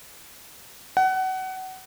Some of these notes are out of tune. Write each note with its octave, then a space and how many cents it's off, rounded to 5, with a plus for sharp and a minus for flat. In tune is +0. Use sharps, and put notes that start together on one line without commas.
F#5 +25